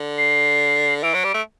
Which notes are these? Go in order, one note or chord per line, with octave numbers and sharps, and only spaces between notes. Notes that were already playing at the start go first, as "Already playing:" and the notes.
Already playing: D3
C7
E3 D7
F#3
G3
A3